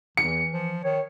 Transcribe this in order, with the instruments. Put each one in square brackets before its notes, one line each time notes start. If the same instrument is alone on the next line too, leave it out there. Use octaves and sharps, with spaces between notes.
[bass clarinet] E2 [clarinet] E3 [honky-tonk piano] C#7
[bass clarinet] F3
[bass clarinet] D#3 [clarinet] C#5